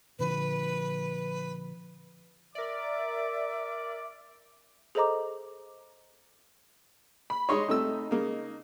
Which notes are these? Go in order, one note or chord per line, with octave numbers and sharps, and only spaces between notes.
A#2 D3 F3 B4
A#4 D5 E5 D6
G#4 A4 C5 D#5 A#5 D6
B5
G#3 D#4 C#5 D#5 C6
C3 A3 D#4 E6
C#3 A#3